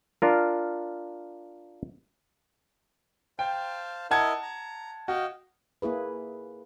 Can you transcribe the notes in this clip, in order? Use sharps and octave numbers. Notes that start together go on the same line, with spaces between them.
D4 F4 A#4
C5 F5 G5 A5
E4 A#4 D#5 F#5 A5 G#6
A#5
F#4 D#5 F5 G5
A#3 E4 G#4 B4